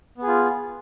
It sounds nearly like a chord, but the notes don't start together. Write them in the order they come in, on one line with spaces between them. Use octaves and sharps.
B3 G#4 F4